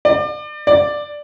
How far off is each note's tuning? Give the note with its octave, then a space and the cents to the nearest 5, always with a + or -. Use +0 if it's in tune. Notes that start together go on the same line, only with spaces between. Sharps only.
D5 +30
D5 +5